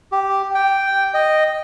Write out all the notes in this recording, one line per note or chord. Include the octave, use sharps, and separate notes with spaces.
G4
G5
D#5